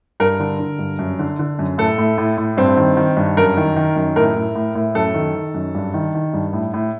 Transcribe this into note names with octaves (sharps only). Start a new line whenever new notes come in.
G2 A#4
D3
D3
G2
F#2
D3
D3
F#2
A2 A4
A2
A2
A2
G2 C4
D#3
D#3
G2
F#2 A#4
D#3
D#3
F#2
A2 A#4
A2
A2
A2
F#2 A4
D#3
D#3
F#2
G2
D#3
D#3
G2
A2
A2